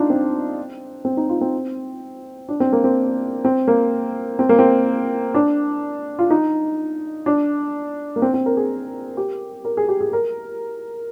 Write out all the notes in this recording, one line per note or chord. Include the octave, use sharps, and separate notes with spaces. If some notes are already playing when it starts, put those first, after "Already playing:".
Already playing: D4 D#4 F4
C4
C4
D#4
F4
C4
D4
C4
A#3
C4
C4
A#3
C4
A#3
C4
D4
F4
D#4
D4
A#3
C4
C4
A#4
G#4
G4
A#4
G#4
G4
G#4
A#4